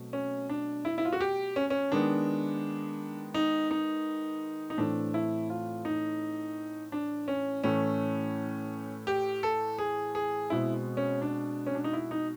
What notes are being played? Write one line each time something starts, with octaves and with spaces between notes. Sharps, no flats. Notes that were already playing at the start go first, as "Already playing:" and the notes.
Already playing: B2 F#3 A3 C4
C#4
D4
E4
E4
F4
F#4
G4
C#4
C#4
D#3 G#3 B3 D4
D#4
D#4
D#4
A2 E3 A3 C4 D4
E4
F4
D#4
D4
C#4
A2 E3 A3 C#4
G4
A4
G#4
G#4
B2 G#3 C4 E4
C#4
D4
C#4
D4
D#4
E4
D#4